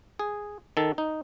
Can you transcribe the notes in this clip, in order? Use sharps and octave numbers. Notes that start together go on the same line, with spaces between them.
G#4
D#3 A4
D#4